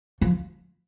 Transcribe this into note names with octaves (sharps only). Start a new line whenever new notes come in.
F3